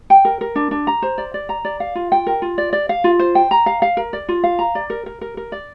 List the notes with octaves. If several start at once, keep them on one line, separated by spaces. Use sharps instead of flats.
G5
A#4
A#4
D4
D4
A#5
C5
D5
D5
A#5
D5
F5
F4
G5
A#4
F4
D5
D5
F5
F4
C5
G5
A#5
F5
F5
A#4
D5
F4
F5
A#5
D5
A#4
A#4
A#4
A#4
D5